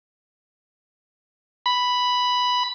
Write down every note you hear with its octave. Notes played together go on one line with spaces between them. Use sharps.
B5